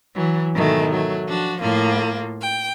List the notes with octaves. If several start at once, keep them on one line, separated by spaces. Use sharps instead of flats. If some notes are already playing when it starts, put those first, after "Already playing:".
E3 F#3
G#2 B2 D#3 E3 F#3 A3
F#3 A3
F3 D4 F#4
A2 A#3 F4
G5